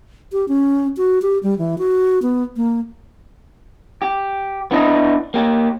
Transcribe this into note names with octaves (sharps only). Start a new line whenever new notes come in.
G4
C#4
F#4
G4
G3
E3
F#4
B3
A#3
G4
B3 D4 E4 D#5
A#3 G4